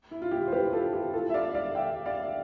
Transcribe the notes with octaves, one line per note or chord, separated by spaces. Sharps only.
E4
F4
E4 G4
C5
G4 B4
F4 A4
E4 G4
F4 A4
E5
D5 F5
D5 F5
E5 G5
D5 F5